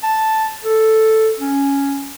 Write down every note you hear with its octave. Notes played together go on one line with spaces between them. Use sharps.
A5
A4
C#4